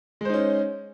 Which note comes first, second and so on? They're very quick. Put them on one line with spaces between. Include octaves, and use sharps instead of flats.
G#3 C5 D#4 C#4